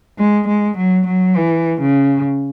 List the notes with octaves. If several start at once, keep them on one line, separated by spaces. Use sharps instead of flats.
G#3
G#3
F#3
F#3
E3
C#3